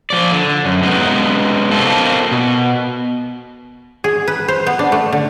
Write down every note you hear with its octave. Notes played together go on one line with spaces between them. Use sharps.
F3 D5
D3
F#2
C3 G#3 B3 D#4
A#3 C4 D#4 F4 A4
B2
G#4
B4
C5
B3
D4
A3
D3